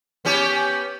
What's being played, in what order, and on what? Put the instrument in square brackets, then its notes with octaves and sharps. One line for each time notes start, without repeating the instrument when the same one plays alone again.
[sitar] B3 C#4 G4